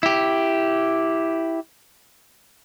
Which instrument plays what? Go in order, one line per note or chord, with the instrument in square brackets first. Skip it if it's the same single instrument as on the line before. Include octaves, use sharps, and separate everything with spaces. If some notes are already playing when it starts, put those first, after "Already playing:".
[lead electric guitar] E4 G4